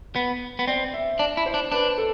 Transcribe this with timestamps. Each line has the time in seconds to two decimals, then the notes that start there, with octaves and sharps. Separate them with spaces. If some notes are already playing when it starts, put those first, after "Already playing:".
0.16 B3
0.59 B3
0.67 C4 D5
0.93 E5
1.19 D4 D5
1.37 E4
1.46 C5
1.54 D4
1.72 D4 B4
1.98 A4